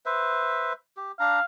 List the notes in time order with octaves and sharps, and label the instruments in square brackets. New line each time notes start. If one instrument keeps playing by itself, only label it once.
[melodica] B4 C5 E5
G4
[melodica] D4 A#5 [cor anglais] F5